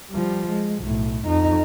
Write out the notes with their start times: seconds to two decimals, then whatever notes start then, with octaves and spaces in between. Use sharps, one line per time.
0.11 F3 G3
0.49 G#3
0.78 B1 A2
1.25 F2 D#4